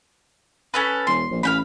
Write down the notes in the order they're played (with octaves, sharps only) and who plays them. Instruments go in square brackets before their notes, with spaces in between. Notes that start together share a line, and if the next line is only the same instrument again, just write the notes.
[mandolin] C#4 A4 B4
[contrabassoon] E1 [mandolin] C6
[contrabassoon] A#1
[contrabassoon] A1 [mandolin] F5 G5 B5